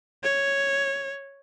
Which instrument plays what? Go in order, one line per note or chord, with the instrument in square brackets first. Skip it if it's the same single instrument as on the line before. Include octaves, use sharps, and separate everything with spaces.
[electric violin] C#5